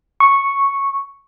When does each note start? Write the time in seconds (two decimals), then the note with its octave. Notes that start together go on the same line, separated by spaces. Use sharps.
0.20 C#6